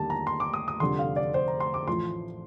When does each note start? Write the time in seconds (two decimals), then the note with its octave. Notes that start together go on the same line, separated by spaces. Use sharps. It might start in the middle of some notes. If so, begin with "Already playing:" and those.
Already playing: D#2 D3 G3 A5
0.10 A#5
0.27 C6
0.40 D6
0.54 D#6
0.68 D#6
0.80 F1 F2 D3 G3 C6
0.99 F5
1.16 D5
1.34 C5
1.48 A#5
1.60 C6
1.74 D6
1.87 A1 A2 F3 C6